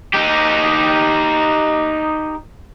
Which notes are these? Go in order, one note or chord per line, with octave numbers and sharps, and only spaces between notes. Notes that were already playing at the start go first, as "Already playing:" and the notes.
D#4 G4